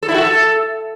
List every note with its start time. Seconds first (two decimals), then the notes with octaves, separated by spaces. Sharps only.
0.03 A4
0.08 E4
0.14 F#4
0.20 A4